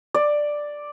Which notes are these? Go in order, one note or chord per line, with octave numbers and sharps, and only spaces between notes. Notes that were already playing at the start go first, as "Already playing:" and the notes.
D5